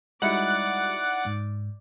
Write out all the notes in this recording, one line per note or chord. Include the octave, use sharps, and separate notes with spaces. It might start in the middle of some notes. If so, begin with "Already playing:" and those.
G3 G#3 D#4 E4 F#4 D5 F#5
G#2